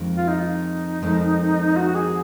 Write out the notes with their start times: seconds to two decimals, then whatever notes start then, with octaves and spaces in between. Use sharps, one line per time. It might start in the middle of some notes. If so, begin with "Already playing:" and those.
Already playing: F2 D#3 G#3
0.17 F4
0.28 D#4
1.02 F2 D#3 G#3
1.76 F#4
1.95 G#4